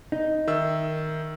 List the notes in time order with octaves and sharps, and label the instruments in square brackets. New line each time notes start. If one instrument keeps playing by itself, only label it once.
[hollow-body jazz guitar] D#4
[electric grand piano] D#3 E5 E6